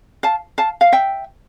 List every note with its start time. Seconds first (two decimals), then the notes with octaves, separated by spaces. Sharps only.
0.23 F5 A5
0.58 F5 A5
0.81 F5
0.92 E5 G5